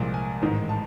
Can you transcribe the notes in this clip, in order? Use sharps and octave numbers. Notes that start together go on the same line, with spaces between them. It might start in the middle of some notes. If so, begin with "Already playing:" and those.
Already playing: C2 A#2 F3 G#3
G#5
A1 G#2 D#3 G#3
A5